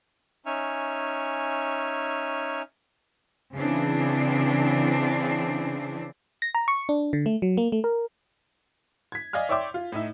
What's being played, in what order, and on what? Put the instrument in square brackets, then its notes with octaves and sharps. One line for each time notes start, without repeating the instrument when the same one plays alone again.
[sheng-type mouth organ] C#4 D#4 E5 G#5 C#6 F6
[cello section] C#3 E3 C4 D4
[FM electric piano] A#6
A#5
C#6
D4
D3
A3
F#3
A#3
A3
A#4
[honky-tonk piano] G#6 B6
D5 D#5 F5 G#5 F6
C#5 D5 E5 G5 C6 D6
F4
A2 D#4 E5